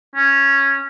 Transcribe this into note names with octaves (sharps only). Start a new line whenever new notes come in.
C#4